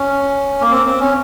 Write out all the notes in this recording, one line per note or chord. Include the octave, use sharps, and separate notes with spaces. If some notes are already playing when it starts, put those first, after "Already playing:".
Already playing: C#4
A#3
C4
C4
C#4